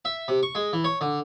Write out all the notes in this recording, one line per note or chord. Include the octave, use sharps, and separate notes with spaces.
E5
C3
C#6
G#3
E3
C#5
D3